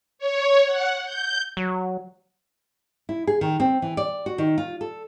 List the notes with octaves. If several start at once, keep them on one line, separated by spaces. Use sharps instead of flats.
C#5
F#5
G6
F#3
E4
G#4
D#3
C4
E3
D5
F#4
D#3
F4
A4